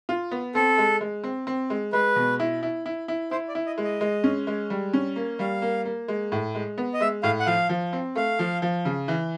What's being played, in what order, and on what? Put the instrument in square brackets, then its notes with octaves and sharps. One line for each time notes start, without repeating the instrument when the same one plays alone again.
[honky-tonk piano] F4
B3
[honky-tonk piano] C4 [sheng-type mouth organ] A4
[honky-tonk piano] G#3
G#3
C4
C4
G#3
[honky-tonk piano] G#3 [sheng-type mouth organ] B4
[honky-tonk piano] B2
E4
E4
E4
E4
[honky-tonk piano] E4 [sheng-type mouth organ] C5
[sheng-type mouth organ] D5
[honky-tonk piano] E4
[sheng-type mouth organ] D#5
[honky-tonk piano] G#3
[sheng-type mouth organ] D#5
[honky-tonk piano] G#3
C#4
G#3
G3
C#4
A#3
[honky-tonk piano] G3 [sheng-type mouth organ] F5
[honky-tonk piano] A#3
A#3
G#3
A2
G#3
B3
[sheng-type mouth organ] D#5
[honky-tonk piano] G#3 [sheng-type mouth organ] E5
[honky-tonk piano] A2 [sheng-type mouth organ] F5
[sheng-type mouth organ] F#5
[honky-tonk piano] F3 [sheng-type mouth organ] F5
[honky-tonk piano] F3
C4
[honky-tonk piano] A3 [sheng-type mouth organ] F5
[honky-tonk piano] F3
F3
C#3
E3